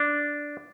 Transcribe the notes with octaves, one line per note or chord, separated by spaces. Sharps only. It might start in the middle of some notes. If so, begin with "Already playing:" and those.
Already playing: D4